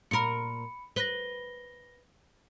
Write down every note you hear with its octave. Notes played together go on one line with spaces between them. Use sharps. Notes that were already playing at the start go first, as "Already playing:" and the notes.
A#2 A#4 B5 C#7
B4 A#6 G7